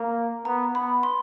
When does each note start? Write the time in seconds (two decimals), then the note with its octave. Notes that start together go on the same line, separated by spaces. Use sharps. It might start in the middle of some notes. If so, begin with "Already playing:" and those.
Already playing: A#3 A#5
0.45 B3 A#5
0.74 B3 B5
1.03 C6